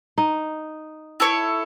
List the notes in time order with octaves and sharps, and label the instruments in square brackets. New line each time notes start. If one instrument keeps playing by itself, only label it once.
[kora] D#4
[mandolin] E4 A4 C#5